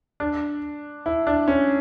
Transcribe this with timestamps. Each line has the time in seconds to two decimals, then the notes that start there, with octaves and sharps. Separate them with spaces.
0.20 D4
1.06 E4
1.27 D4
1.48 C#4